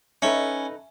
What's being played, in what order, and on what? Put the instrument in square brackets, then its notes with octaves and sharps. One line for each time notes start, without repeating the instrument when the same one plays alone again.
[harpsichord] C#4 [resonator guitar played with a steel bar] D#4 A4 B4 [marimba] E5